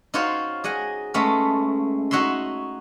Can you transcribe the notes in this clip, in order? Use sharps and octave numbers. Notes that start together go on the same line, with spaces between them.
D#4 F4 F#4 C5 C#5
G#4 D#5 F#5 G#5
G#3 A3 B3 C#4
D#4 F#4 C#5 E5 C6